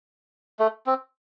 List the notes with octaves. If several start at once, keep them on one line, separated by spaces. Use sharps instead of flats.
A3
C4